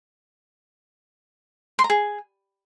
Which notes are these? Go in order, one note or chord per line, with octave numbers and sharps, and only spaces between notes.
C6
A#5
G#4